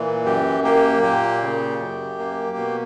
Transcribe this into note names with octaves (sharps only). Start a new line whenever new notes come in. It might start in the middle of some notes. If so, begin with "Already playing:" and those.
Already playing: A#2 E3
F#2 G4
A#3 G4
A#2 G4
C#3
F#2
A#3
B2